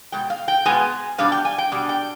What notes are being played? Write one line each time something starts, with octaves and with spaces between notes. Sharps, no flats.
B2 G#3 G5
F5
G5
B2 G#3 B3 G#5
B2 G3 D4 F5
G5
G#5
G5
B2 G3 D4
G5